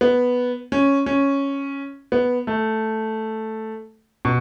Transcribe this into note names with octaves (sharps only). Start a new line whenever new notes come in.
B3
C#4
C#4
B3
A3
B2